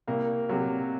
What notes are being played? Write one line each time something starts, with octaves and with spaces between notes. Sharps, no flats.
C2 A#3
C3 F#3